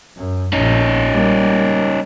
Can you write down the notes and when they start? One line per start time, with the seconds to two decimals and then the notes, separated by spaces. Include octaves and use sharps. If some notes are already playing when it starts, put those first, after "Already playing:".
0.17 F#2
0.53 A#1 C#4 D#4
1.11 G3 A#3